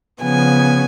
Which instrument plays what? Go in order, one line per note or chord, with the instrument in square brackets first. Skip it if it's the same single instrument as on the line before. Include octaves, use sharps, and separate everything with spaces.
[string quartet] C#3 F3 B3 G#5